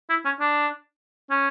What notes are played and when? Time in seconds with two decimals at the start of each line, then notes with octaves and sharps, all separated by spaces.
0.10 E4
0.25 C#4
0.40 D4
1.31 C#4